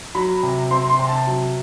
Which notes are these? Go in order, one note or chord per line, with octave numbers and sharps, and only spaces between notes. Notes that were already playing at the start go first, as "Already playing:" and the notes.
F#3 B5
C3
C4 C6
C6
C3
A5
F#3